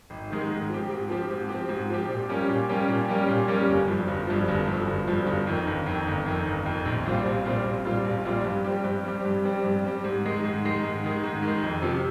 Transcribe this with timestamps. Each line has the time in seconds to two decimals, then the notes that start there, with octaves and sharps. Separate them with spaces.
0.10 G#1
0.30 G#2 D#3 G#3
0.50 G#2
0.70 F3 C4 G4
0.90 G#2
1.09 F3 C4 G4
1.30 G#2
1.49 F3 C4 G4
1.69 G#2
1.90 F3 C4 G4
2.09 A#2
2.29 G3 A#3 C#4 G4
2.49 A#2
2.69 G3 A#3 C#4 G4
2.88 A#2
3.08 G3 A#3 C#4 G4
3.29 A#2
3.48 G3 A#3 C#4 G4
3.68 G1
3.88 G2 F3
4.08 G1
4.27 G2 F3
4.48 G1
4.67 G2 F3
4.87 G1
5.07 G2 F3
5.27 G1
5.47 F2 D#3
5.67 G1
5.86 F2 D#3
6.07 G1
6.26 F2 D#3
6.46 G1
6.66 F2 D#3
6.85 A#1
7.06 A#2 G3 C4 F4
7.26 A#1
7.45 A#2 G3 C4 F4
7.65 A#1
7.85 A#2 G3 C4 F4
8.05 A#1
8.25 A#2 G3 C4 F4
8.44 G2
8.64 G3 C4 G4
8.84 G2
9.04 G3 C4 G4
9.25 G2
9.44 G3 C4 G4
9.64 G2
9.84 G3 C4 G4
10.04 G#2
10.23 D#3 G#3
10.44 G#2
10.64 D#3 G#3
10.84 G#2
11.04 D#3 G#3
11.24 G#2
11.42 D#3
11.47 G#3
11.62 F2
11.82 C3 F3